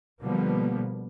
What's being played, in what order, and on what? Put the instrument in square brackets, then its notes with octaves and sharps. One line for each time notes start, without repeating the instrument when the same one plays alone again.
[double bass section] B2 D3 F3 G3 A#3 B3